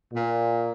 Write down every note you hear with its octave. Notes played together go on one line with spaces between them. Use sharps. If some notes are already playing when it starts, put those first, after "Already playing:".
A#2